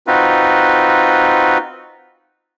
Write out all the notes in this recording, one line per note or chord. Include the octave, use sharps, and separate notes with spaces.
C4 D#4 F4 F#4 B4